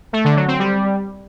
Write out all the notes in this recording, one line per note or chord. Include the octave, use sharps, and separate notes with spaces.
A3
D3
F#3
C4
G3